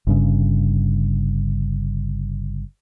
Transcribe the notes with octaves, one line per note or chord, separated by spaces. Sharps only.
G1 G2 C#3